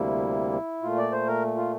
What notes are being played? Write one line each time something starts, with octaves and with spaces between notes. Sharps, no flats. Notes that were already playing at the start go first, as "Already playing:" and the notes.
Already playing: D2 C3 G3 A#3 E4
A#2 A3 F4
D5
C5
A#4
F4